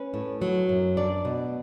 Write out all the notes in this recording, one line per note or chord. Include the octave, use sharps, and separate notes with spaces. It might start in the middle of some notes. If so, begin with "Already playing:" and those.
Already playing: C#4 B4
A2
F#3
F#2
D4 D5
B2